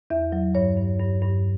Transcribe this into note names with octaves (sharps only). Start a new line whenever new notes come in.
E2 E5
F#3
G2 C#5
G2
G2
G2